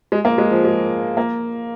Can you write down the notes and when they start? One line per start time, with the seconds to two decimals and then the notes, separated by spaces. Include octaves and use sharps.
0.12 G#3
0.25 A#3
0.38 G#3
0.51 F3
0.64 G#3
1.17 A#3